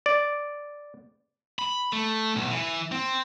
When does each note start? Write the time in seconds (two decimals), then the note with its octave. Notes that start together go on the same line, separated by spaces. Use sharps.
0.06 D5
1.59 B5
1.93 A3
2.36 B1
2.51 E3
2.92 C4